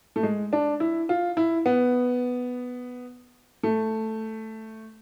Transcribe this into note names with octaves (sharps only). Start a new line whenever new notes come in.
A3
G#3
D4
E4
F4
E4
B3
A3